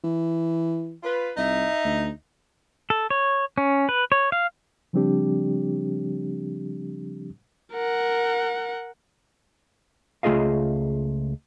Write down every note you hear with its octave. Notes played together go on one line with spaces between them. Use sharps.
E3
F4 B4
C2 D#4 E5
D2
A4
C#5
C#4
B4
C#5
F5
C#3 F3 G3 C4 D4 G4
A#4 F#5
C#2 A3 F4 G#4 D#5 F5